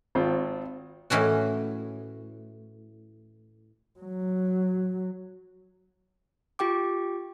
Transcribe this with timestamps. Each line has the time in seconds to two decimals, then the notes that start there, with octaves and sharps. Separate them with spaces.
0.15 G#1 C4 F4
1.10 A2 E3 C#4 F#4
4.00 F#3
6.59 F4 G4 G5 D6